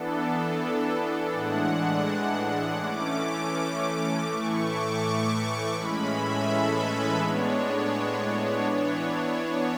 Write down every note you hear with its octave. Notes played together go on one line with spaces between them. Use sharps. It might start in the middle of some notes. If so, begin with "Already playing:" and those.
Already playing: E3 B3 D4 A4
A2 E3 G#3 D4 F#5
E3 A3 C#4 D6
A2 E3 A3 C#6
D6
C#6
A2 E3 G#3 C#4 B5
E5
A4
B4
A2 G#3 B3 D4 C#5
E3 B3 D4
C#5